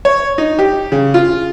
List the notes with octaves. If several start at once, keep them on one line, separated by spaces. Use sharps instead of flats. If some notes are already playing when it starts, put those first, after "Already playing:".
C#5
D#4
G4
C#3
F4